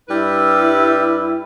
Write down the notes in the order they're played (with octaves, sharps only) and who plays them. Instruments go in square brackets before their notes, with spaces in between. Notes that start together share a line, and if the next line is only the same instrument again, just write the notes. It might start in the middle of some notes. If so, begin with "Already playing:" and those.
[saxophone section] G2 G3 B4 [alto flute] E4